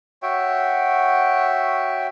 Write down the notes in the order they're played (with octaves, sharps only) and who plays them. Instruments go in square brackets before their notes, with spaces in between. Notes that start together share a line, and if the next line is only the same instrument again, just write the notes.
[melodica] F#4 C#5 E5 G5